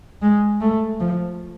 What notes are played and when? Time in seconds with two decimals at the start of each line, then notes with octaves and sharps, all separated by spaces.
0.22 G#3
0.61 A3
1.00 F3